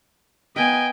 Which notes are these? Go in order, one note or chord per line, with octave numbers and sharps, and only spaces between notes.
B3 A#4 B4 D#5 G5 G#5